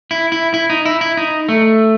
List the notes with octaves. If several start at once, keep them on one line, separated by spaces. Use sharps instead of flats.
E4
E4
E4
D#4
E4
E4
D#4
A3